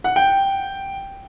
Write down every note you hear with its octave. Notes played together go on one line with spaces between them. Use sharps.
F#5
G5